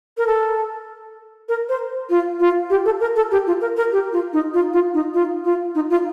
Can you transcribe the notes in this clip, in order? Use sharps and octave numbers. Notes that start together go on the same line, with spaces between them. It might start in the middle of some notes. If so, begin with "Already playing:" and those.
A#4
A4
A#4
C5
F4
F4
G4
A4
A#4
A4
G4
F4
A#4
A#4
G4
F4
D#4
F4
F4
D#4
F4
F4
D#4
F4